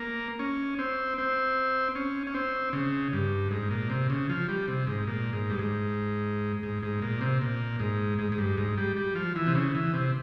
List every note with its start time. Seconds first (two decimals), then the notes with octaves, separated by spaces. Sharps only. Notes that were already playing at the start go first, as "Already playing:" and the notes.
Already playing: A#3
0.39 C#4
0.79 C4
1.18 C4
1.95 C#4
2.27 C#4
2.34 C4
2.73 C#3
3.13 G2
3.51 G#2
3.71 A#2
3.90 C3
4.10 C#3
4.29 F3
4.49 G3
4.68 C3
4.87 G#2
5.07 A#2
5.33 G#2
5.50 G2
5.59 G#2
6.63 G#2
6.82 G#2
7.02 A#2
7.21 C3
7.41 A#2
7.79 G#2
8.19 G#2
8.32 G#2
8.38 G2
8.57 G#2
8.78 G3
8.96 G3
9.15 F3
9.36 E3
9.47 C3
9.55 C#3
9.75 E3
9.94 C3